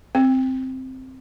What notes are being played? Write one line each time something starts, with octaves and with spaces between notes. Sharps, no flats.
C4